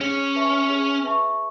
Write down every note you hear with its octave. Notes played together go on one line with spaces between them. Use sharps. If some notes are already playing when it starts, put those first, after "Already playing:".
C#4 G#4
B4 E5 A5 C#6
G#4
B4 E5 A5 C#6